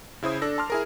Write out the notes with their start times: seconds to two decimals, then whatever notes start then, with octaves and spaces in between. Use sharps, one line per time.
0.22 C#3 E4 C5 D#6
0.42 D4 A4 E6 A#6
0.58 A5 C6 D6 F6
0.70 E4 G#4 A#4